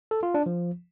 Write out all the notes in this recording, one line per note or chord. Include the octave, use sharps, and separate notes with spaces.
A4
F4
D4
F3